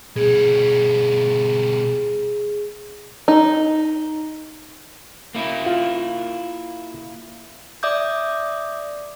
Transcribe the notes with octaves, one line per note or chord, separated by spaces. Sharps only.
B2 G3 G#4
D#4
A#3 E4
F4
D5 E5 D6 D#6 G6